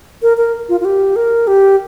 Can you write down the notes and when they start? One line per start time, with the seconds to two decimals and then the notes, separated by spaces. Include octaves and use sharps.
0.22 A#4
0.37 A#4
0.69 F4
0.80 F4
0.85 G4
1.16 A#4
1.47 G4